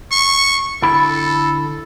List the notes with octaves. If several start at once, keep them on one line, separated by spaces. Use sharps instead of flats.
C#6
D3 E4 A4 B5